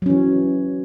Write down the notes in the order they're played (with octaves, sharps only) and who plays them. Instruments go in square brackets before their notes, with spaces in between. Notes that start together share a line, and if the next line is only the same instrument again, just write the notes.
[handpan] F#3
C#4
E3